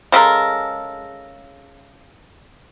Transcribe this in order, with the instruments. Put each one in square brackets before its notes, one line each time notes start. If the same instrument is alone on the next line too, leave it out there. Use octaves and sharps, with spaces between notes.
[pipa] C#3 G#3 A4 A#4